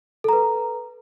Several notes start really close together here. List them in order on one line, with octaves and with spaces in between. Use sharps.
A4 A#5 B4